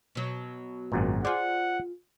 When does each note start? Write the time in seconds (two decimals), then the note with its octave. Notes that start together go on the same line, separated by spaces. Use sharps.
0.15 B2 F#3
0.92 G#1 F#2 A#2
1.25 F4 G#4 C5 D5 F#5